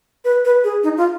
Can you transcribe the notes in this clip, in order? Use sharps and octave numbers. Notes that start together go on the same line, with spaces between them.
B4
B4
G#4
D#4
F4